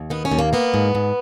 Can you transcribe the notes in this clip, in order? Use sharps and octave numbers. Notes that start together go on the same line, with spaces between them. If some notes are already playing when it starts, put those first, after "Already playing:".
Already playing: D#2
D#3 B3
C#4
D#2
A#3
A#3 B3
G#2
G#2